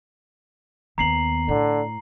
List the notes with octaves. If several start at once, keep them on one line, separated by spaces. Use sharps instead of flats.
D#2 B3 A#5 C7 F#7
A2 D3